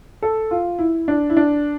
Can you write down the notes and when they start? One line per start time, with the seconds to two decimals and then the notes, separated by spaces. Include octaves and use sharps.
0.22 A4
0.51 F4
0.79 E4
1.08 D4
1.30 E4
1.37 D4